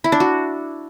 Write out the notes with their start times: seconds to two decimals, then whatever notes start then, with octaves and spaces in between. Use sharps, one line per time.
0.04 E4
0.12 D4
0.20 F#4